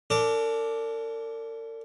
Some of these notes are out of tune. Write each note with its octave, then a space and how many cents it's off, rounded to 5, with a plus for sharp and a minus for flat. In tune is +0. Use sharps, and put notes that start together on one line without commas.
D4 -25 A#4 -45 D6 +0